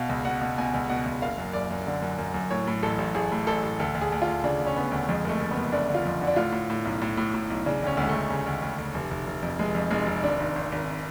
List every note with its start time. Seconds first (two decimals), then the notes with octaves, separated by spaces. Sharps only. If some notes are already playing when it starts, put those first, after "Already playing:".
Already playing: B2 F5
0.09 C#2
0.25 B2 F#5
0.41 B2
0.58 B2 G#5
0.74 C#2
0.89 B2 F#5
1.06 C#2
1.22 F#1 F5
1.38 F#2
1.53 F#1 D5
1.71 F#2
1.87 D3
2.02 F#2
2.18 F#2
2.34 F#2
2.50 A2 C#5
2.67 A2
2.82 A1 A4
2.98 A1
3.15 A1 G#4
3.32 A2
3.47 A1 A4
3.63 A1
3.80 D2 A4
3.95 D2
4.01 G#4
4.12 D2
4.22 F4
4.28 D2
4.44 C#3 D4
4.59 D2
4.67 C#4
4.76 C#3 B3
4.91 D2 A3
5.09 F2 G#3
5.24 F#1 A3
5.40 F#1
5.51 B3
5.57 F#1
5.72 F#1 D4
5.89 D3
5.94 F4
6.05 F2
6.21 D3
6.27 D4
6.36 A2 F4
6.52 A2
6.70 A2
6.85 B1
7.01 A2
7.17 A2
7.34 A2
7.50 B1
7.66 C#3 D4
7.82 D2 C#4
7.97 D2 G#3
8.09 A3
8.14 D2
8.30 C#3
8.46 D2
8.62 D2
8.78 D2
8.94 F1
9.11 F1
9.27 F1
9.42 F2
9.58 F1 G#3
9.75 F2
9.90 F1 G#3
10.06 F1
10.23 G#1 D4
10.40 G#1
10.56 G#1
10.72 G#1